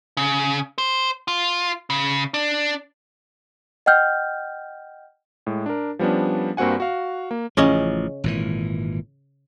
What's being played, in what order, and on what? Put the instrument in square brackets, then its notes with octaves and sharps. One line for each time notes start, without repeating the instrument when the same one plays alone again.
[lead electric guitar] C#3
C5
F4
C#3
D4
[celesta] D#5 F#5 G5 F6 G6
[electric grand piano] A2 G#3
D4 A#4
F3 G3 B3 C#4 D4
G2 A#3 C4 F#4 F#5 G#5
F#4 F5
A#3
[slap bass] A1 F3 [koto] C#3 C#4 D#5
[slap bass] G#1 A#2 E3